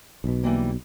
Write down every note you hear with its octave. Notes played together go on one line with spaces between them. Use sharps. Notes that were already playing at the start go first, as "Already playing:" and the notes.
B1 B2
E3 G3 A#3